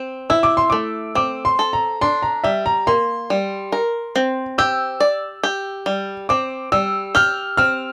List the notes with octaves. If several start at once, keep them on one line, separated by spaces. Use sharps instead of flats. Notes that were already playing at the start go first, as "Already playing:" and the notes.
Already playing: C4
E4 E6
D6
C6
A3 D6
C4 D6
C6
A4
A#5
D4 C6
A#5
G3 E5
A#5
A#3 C6
G3
A#4
C4
G4 E6
D5
G4
G3
C4 D6
G3 E6
G4 F6
C4 F6